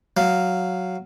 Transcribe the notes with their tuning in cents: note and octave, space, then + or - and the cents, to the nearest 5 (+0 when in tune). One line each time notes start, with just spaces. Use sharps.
F#3 +0 F5 +0